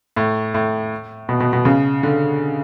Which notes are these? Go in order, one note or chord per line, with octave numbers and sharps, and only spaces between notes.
A2
A2
B2
B2
B2
C#3
D3